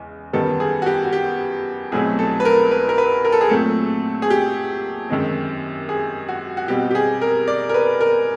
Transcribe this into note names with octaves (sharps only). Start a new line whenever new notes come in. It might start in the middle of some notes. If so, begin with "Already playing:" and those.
Already playing: E2 C#3 G#3
F#2 D#3 G3 B3 A4
G#4
F#4
G4
F#4
G4
C2 B2 F#3 A3 C4 G#4
A4
B4
A#4
B4
A#4
B4
A#4
A4
G#4
A#2 F#3 A3 C4 A4
G#4
G4
F#2 D#3 G#3 C4
G#4
F#4
F#4
B2 G3 C4 G4
G4
G#4
A#4
D5
A#4
B4
A#4